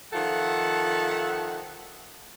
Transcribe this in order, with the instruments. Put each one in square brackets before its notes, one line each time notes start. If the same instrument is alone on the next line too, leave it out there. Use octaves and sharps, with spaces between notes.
[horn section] D#3 F3 F4 A4 E5 F#5